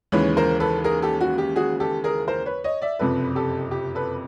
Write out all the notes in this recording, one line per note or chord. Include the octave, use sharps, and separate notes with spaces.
D#2 C#3 E3 G#3 B4 C#5
A#4 C5
A4 B4
G#4 A#4
G4 A4
F#4
G4
F#4 G#4
G4 A4
G#4 A#4
A#4 C5
B4 C#5
C#5 D#5
D5 E5
F#1 F2 C3 A4 B4
G4 A4
G4
A4 B4